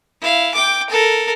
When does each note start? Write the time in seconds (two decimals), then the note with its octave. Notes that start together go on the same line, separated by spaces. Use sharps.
0.22 E4 F5
0.54 G5 D6
0.90 A4 A#4